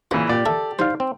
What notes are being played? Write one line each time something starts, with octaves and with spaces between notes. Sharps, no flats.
A#2 C#3 E3 F#4 C5
A#2 G4 D5
A4 A#4 E5
D#3 G3 C5 F5
C4